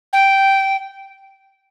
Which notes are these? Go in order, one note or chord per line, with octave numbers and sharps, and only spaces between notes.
G5